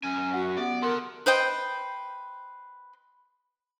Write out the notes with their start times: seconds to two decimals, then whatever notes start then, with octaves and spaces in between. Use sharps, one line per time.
0.03 F#2 C#4 G#5
0.34 F#4 F#5
0.57 B3 G4 D5 E5
0.83 A4 A#4 F#5 C6
1.26 B4 C5 D#5 G5